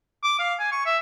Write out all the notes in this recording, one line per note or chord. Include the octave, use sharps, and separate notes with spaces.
D6
F5
G#5
C#6
E5